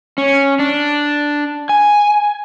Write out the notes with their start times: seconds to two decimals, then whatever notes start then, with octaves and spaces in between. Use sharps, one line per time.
0.18 C#4
0.59 D4
1.69 G#5